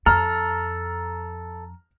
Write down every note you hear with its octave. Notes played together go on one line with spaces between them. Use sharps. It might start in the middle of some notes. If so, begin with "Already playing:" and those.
F2 A4 A#5 F6